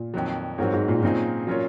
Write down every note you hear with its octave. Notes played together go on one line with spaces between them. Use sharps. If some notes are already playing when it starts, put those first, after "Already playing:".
Already playing: A#2
F2 D#3 F#3
G#2 F#3 C4 F#4 A#4 C#5
G#2
A#2
A#2 C#3 F#3 C4 D#4 G#4
F#3 C#4 F4 A#4 C#5